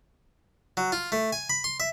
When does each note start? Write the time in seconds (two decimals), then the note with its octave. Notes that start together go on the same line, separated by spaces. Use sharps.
0.77 F#3
0.92 F4
1.12 A3
1.33 G#5
1.50 B5
1.64 C6
1.80 E5